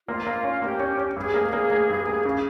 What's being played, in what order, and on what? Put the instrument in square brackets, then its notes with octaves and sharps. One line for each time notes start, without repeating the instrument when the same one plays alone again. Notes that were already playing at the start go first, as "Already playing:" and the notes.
[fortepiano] A#3 [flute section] F4
[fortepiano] A#3
C#4
[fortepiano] A#3 [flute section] G4
[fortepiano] C#4
C#4
[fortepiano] G2 [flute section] G#4
[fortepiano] A#3
A#3
A#3
G2
A#3
C#3